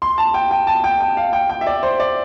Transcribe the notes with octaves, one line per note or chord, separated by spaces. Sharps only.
C6
A5
G5
G5
A5
G5
G5
F5
G5
G5
E5
D5
C5
D5